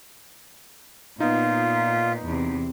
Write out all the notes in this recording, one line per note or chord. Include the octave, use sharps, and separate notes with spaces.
A#2 B3 D#4 F4
E2 C3